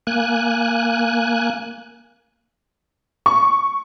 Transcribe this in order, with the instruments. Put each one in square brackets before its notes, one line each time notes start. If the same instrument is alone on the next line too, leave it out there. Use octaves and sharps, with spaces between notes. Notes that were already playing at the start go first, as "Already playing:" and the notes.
[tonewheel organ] A#3 G#5 F#6
[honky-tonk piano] C#6